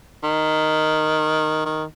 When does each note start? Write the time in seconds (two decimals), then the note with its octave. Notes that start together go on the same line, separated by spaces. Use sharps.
0.23 D#3
1.66 D#3